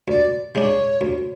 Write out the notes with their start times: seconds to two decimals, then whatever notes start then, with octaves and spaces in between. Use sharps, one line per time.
0.08 D2 D5
0.55 C#3 G#3 D4 C#5
1.01 D2